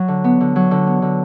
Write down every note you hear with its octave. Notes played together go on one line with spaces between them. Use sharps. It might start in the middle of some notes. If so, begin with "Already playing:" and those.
Already playing: F#3
D3
B3
D3
F#3
D3
B3
D3